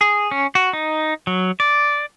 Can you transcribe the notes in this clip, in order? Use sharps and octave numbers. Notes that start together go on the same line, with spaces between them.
G#4
C#4
F#4
D#4
F#3
D5